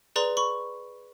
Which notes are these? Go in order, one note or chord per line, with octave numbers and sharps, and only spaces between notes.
G#4 B4 D5 A#5 C6
B5 C#6